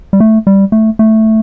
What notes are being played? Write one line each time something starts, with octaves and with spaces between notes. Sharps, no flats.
G3
A3
G3
A3
A3